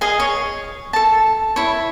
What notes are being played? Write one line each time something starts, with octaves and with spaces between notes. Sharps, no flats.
G#4 D#5 F5 G#5
C#5
A4 A5
E4 C#5